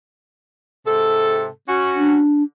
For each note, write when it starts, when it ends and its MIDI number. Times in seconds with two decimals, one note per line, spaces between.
0.87 1.48 44
0.87 1.48 48
0.87 1.48 69
1.69 2.19 61
1.69 2.19 66
1.96 2.43 62